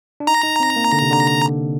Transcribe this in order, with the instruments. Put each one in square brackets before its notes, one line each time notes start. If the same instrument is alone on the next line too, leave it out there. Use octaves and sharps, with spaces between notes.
[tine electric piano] D4
[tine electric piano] D#4 [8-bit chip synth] A#5
[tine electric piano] D#4
C4
A#3
D3
C3
D3